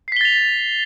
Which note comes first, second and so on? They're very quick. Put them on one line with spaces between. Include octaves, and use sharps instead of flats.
C7 B6 G7 A6 F7